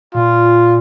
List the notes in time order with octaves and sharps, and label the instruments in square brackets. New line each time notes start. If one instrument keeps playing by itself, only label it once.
[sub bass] A#2 [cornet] F4